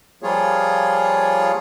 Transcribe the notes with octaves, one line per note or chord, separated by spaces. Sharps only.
F3 G3 A#3 F4 G#4 C#5